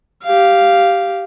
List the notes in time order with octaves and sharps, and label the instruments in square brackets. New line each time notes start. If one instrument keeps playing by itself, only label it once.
[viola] G4 F5